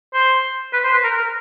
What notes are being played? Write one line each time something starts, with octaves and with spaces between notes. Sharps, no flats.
C5
B4
C5
B4
A#4
A#4